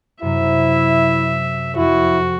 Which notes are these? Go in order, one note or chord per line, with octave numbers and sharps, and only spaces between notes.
F#2 C3 F#3 E4 E5
F2 E4 F#4